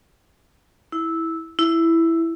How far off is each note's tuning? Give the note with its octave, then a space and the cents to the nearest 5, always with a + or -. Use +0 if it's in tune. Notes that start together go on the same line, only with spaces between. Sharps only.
E4 -10
E4 +5